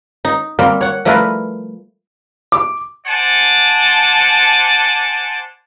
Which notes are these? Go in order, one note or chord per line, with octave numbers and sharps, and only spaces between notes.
D#4
G3 A#3 C4
C#5 F#5
F3 G3 A3 E4 A#4 B4
D6
C5 D5 F#5 G#5 A5